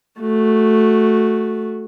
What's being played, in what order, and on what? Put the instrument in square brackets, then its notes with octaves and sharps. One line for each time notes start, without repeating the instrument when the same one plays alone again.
[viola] A3 F#4